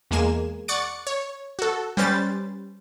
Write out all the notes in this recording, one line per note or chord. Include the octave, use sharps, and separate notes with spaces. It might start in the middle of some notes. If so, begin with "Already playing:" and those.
E2 G#3 A#3 G#5 E7
D5 F#5 C#6 A6 C#7 D7
C#5
F#4 A4
G3 C#4 G4 B4 C5 A6